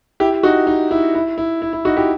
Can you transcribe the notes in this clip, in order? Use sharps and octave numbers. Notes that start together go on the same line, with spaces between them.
E4 G4
D#4 F#4
D#4
E4
E4
E4
E4
E4
D#4 F#4
E4 G4